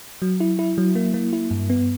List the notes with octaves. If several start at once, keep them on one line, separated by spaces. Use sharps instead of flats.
F#3
E4
E4
F#3
A#3
A#3
E4
G2
B3